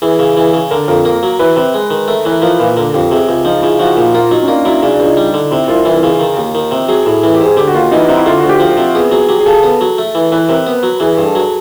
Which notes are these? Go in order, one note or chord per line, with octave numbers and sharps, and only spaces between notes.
E3 G#4
C#3
E3
C#3
D3 A#4
F2 A#4
A#3
F#3
E3 B4
C3 B4
G#3
D#3
A3 A#4
E3 B4
A#4
F3 A#4
A#2 B4
D3 A#4
F2 G4
C3 G#4
C#2
F3 D#4
C#3 E4
F3 F#4
A#2
A#3 F4
F#3 D#4
C#4
A#3 D4
F#3 E4
C#3 D4
D4
C#2
D#4
G3
D3
C3 E4
C2 F4
E3
C#3
D#3
D#2
D#3
C3
F#3 G#4
A2
E3
G4
G#2
G#4
D3 G4
F#4
D#2 F4
E3 D#4
E4
C3 D#4
E4
D3 F4
F#4
D2
G4
F3
C3
B3 G#4
F#3 G#4
F#3 G4
G#4
C#3 A4
B3 A4
F#3
A3
E3
E3 B4
C3 A#4
B3
F#3
E3 G#4
G2
A4
F#3